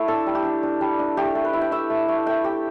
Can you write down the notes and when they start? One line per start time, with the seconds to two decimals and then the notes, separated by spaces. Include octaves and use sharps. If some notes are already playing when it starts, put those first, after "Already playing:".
Already playing: A3 E4
0.08 D4 A4
0.27 G3
0.35 G4
0.45 D4
0.63 D4
0.81 G3
0.99 D4
1.17 A3 G4
1.35 A3
1.45 B4
1.53 E4
1.61 G5
1.72 A3 E5
1.90 A3
2.08 A3
2.26 A3 G5
2.44 A3 G4